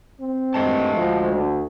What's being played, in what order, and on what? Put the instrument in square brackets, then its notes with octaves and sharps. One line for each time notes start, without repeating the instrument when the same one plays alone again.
[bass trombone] C4
[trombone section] E2 G2 A3 [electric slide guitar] G#3 D#5 A5
[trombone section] D2 [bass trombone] F3
[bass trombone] D3